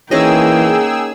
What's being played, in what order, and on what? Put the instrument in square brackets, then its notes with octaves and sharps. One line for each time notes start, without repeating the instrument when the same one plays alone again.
[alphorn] E3 [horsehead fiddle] A#3 G5 [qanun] C#4 D#4 D#5 [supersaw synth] G#4 E6